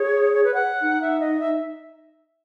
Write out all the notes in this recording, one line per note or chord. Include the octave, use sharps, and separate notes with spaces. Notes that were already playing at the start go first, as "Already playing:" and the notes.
Already playing: G#4 C#5
C#5
B4
F#5
D#4
E5
D#5
E5